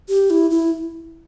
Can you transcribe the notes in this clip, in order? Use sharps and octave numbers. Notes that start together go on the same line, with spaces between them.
G4
E4
E4